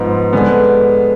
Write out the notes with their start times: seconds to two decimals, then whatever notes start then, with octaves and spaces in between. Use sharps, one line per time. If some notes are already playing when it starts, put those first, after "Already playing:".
Already playing: G#2 F3 B3
0.33 D3 G#3 B3